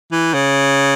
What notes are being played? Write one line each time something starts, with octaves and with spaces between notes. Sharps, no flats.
E3
C#3